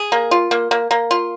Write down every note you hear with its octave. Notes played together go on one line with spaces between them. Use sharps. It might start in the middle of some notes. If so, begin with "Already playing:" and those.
Already playing: G#4
A#3
F4
A#3
A#3
A#3
F4